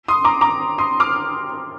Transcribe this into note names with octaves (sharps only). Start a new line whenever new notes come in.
C6 D#6
A#5 D6
A#5 D6
C6 D#6
D6 F6